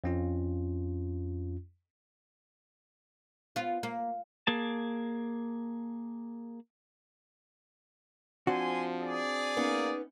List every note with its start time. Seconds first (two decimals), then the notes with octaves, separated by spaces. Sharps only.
0.04 F2 C#4 F4
3.56 B3 F4
3.83 A#3
4.47 A#3 G#4 A5
8.47 F3 C4 D4 F#4 G#5 C6
9.00 G#4 D5
9.57 A#3 B3 C#4 D#4